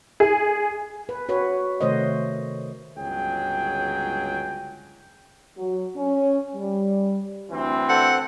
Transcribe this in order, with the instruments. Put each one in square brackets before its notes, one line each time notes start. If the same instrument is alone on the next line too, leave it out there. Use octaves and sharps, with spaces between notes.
[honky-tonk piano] G#4
[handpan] B4
F#4 B4 C#5
C3 D#3 A3 C5 C#5 D#5
[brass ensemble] G1 C#2 F#3 G#4 G5
[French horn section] F#3
C#4
G3
[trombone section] D2 E3 C4
[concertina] A4 C5 [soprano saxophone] F#5